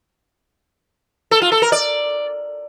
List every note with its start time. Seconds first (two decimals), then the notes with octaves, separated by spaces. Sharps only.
1.31 A4
1.42 F4
1.52 A4
1.62 A#4
1.72 D5